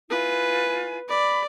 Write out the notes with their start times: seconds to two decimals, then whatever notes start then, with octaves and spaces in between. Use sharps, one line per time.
0.10 E4 F4 B4 G#5
1.09 D5 B5